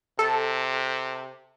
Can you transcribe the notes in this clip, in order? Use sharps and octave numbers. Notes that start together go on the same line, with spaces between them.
C3 A4